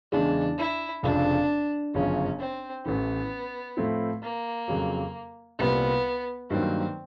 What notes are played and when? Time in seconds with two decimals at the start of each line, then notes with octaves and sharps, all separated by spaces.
0.12 E2 C#3 E3 G#3 D4
0.58 E4
1.03 F1 F2 C#3 F3 D4
1.94 G1 F#2 C#3 F3 C#4
2.39 C4
2.86 A1 A2 E3 B3
3.77 A2 F3 A3 C4 E4
4.22 A#3
4.68 F2 C#3 F#3
5.59 C2 A#2 G3 B3 C4
6.50 G2 D#3 F#3 A#3 C4